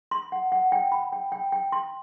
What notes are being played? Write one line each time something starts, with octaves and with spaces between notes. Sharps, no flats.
C6
F#5
F#5
G5
B5
G5
G5
G5
C6